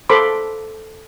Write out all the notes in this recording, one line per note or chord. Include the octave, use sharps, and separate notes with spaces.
A4 A#4 C5 B5 C6 D6